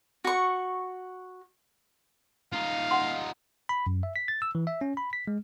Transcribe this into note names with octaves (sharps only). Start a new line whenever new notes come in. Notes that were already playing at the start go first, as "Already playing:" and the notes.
F#4 C#6
D#4 F4 F5
F#5 C6
B5
F#2
E5
B6
A6
E6
E3
E5
C#4
B5
B6
G#3